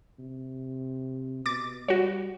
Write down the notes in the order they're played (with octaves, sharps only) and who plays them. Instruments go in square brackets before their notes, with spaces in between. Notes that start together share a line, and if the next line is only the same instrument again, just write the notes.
[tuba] C3
[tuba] B2 [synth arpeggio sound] D6 A6
[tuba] G3 [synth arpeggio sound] F#4 C#5